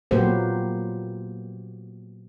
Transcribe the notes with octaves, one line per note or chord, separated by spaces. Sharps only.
A#2 F#3 A#3 B3 G4 C5